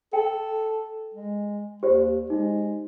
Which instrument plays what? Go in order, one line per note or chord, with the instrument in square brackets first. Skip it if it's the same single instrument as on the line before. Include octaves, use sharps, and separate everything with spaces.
[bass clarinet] A4 [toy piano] G5
[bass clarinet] G#3
[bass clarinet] D#2 [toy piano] G4 C5 D5
[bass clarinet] G#3 [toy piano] D#4